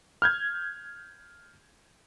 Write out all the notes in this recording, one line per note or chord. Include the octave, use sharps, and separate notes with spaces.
F6 G6 G#6